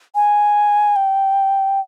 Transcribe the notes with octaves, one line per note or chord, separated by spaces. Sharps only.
G#5
G5